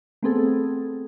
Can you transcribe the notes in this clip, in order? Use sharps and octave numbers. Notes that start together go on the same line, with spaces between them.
A3 B3 C4 G#4 A4